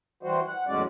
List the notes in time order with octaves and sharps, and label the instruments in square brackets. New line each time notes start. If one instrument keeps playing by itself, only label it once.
[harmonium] E3 G3 F#4 C5
F#5
E2 A2 F#3 G#3 C#4 D5